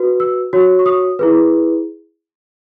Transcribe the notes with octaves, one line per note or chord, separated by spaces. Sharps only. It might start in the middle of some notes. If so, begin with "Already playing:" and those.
Already playing: F#4 B4
E6
F#4 C#5
C#6
D#6
E4 G#4 B4